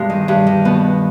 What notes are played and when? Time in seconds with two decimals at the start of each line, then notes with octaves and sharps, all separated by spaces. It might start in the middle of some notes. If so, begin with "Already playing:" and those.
Already playing: G2 B2 G#3
0.10 D#3
0.28 G2
0.47 D#3
0.65 B2 B3